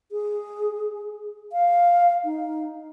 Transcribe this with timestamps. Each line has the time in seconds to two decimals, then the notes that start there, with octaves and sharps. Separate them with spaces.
0.12 G#4
1.53 F5
2.25 D#4